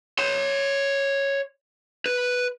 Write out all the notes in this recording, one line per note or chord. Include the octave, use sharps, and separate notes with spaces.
C#5 C6
B4